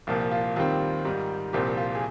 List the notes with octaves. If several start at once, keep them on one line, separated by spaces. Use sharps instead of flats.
C2 A#2 F3 A#3
F4
D#2 D#3 G3 C4 F4
G#2 D#3 G3
C2 A#2 F3 C4 G4
F4
G#4